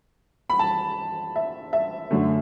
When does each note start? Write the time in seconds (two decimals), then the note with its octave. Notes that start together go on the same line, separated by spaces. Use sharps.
0.50 B5
0.59 A5
1.36 E5
1.73 E5
2.10 F#2 D3 A3